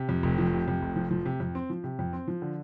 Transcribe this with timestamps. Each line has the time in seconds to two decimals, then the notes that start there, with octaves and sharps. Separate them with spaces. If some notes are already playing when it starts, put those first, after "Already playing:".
Already playing: C3
0.09 F2
0.23 F1
0.38 F3
0.53 C3
0.68 F2
0.82 F1
0.96 F3
1.11 F3
1.26 C3
1.40 F2
1.55 C4
1.70 F3
1.84 C3
1.99 F2
2.13 C4
2.28 F3
2.42 D3